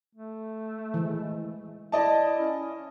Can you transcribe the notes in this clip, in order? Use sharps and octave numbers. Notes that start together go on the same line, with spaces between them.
A3
E3 G#3
E4 D5 D#5 A5
C#4